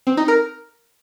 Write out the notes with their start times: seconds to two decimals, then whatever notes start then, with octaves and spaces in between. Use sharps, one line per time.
0.07 C4
0.17 D#4
0.28 A#4